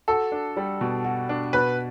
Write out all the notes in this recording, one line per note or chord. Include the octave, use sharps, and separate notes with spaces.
F#4 A4
D4
G3
B2
F#4
D4
B2 B4